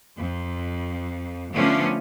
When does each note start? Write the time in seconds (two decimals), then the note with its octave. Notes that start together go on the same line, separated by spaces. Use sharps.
0.17 F2
1.54 D3 F3 A3 B3 C#4 D4